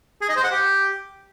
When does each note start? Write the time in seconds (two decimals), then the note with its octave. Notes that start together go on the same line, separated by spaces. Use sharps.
0.21 G#4
0.29 D#5
0.36 C5
0.44 F#5
0.51 G4